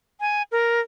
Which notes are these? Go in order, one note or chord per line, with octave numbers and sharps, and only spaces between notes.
G#5
A#4